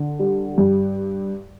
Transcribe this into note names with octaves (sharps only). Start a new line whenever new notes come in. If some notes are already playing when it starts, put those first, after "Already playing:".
Already playing: D3
G3
G2